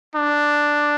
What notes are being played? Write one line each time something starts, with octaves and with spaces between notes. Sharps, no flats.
D4